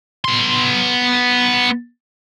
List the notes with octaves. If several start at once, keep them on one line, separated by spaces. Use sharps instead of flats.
B3 C6